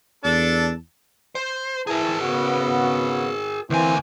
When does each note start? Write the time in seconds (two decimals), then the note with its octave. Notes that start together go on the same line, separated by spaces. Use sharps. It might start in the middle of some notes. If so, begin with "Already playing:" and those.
0.24 E2 D4 A4 A5
1.35 C5
1.87 E3 G#4 A#4 A5
2.21 C#3 B3 F#4
3.70 D2 E3 A#3 C4 G#5